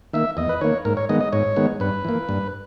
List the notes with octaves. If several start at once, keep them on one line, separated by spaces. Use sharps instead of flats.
D#3 A#3 E5
E2 D#5
B4
D#3 A#3 C#5
G#2 A#4
C#5
D#3 G#3 B3 D#5
D#5
G#2 C#5
D#3 G#3 B3
G2 B4
E3 A#3
G2